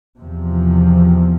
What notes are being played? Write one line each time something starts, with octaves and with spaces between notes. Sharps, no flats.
E2 C3 F3